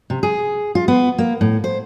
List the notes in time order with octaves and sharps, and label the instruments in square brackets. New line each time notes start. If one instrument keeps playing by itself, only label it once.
[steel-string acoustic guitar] C3
G#4
F4
B3
A#3
A2
C5